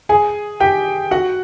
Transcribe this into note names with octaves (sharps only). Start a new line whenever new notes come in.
G#4 G#5
G4 G5
F#4 F#5